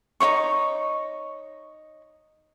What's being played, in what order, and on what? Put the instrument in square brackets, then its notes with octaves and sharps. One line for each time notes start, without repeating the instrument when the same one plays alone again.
[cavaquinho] D#4 E4 C#5 C#6